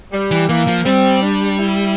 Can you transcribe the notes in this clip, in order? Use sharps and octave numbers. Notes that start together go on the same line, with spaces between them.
G3
E3
E3 A#3
F3
G3 C4
D4
E4